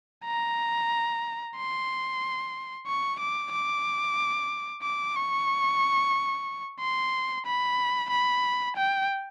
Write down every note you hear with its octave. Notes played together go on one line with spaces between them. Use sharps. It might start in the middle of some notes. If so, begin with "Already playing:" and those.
A#5
C6
C#6
D6
D6
D6
C#6
C6
B5
B5
G5